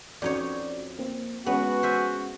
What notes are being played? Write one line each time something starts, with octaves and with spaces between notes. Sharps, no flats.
F2 C#4 D#4 F#4 C#5 D5
A#3 C4
G#3 B3 C#4 F#4 G#4
C5 E5 G#5